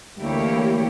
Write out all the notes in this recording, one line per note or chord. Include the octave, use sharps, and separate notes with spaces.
D2 E3 A#3 E4 G4 C#5